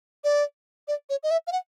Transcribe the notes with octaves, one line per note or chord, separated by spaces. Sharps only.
D5
D5
C#5
D#5
E5
F5
F#5